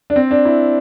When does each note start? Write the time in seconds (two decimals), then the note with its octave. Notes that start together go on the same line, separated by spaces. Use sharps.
0.10 D4
0.16 C4
0.31 D4
0.45 E4